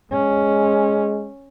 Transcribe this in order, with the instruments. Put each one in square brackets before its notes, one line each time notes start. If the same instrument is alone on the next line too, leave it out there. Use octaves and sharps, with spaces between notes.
[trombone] G#3 [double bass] C#4